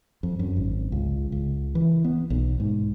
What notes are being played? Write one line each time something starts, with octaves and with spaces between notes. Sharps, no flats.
F2
F#2
G#1
C#2
C#2
E3
B3
B1
G#2